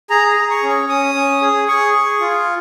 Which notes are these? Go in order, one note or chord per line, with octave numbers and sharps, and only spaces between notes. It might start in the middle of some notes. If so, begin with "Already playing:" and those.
G#4 A#5
A#5
G#4
C#6
C#4
C#6
C#4 D#6
C#4
G#4
G#4 C#6
G#4
F4